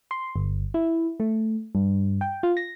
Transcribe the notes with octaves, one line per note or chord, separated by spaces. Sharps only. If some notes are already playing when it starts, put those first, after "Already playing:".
C6
G1
E4
A3
G2
G5
F4
A#6